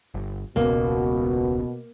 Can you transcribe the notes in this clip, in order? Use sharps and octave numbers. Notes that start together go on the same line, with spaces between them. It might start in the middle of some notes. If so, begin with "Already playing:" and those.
G1
E1 C#2 B2 A#3